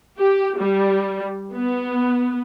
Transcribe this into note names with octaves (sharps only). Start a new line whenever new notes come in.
G4
G3
B3